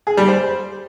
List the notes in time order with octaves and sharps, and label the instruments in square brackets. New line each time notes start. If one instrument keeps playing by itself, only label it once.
[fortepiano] G#4
G3
C5